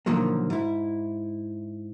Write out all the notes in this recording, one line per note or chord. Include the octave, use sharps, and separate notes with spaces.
B2 D3 D#3 F3 F#3 A#3
G#2 E4